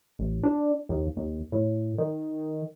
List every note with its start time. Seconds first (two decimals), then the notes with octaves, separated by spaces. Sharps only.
0.19 A1
0.43 D4
0.89 D#2
1.17 D#2
1.52 A2
1.98 D#3